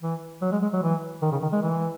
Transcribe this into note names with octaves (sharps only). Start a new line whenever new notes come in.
E3
F#3
G#3
G#3
F#3
E3
D#3
C#3
D#3
G#3
E3